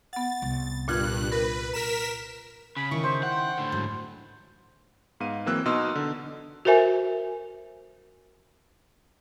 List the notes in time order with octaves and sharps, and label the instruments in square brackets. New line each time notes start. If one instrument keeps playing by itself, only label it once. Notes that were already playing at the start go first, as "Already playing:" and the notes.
[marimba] B3 F#5 [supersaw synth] A6
[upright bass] C2
[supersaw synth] G2 F#6 [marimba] A#2 F4 G#6
[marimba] A#4 [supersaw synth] B4
[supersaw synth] A#4 B6 E7 [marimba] A#5
[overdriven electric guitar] C#3 [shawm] B5
[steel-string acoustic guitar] D#3 E4 [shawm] C#6
[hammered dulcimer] C5
[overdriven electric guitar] F#5 [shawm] G5
[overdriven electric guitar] A2 D3
[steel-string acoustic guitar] G#2 F#3
[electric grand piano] G#2 B3 F5 D#7
E3 F#3 A#3 C4 E6 F#6
B2 D#4 D#5 C6 E6 F6
D3
[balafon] F#4 A4 A#4 C5 E5 G#5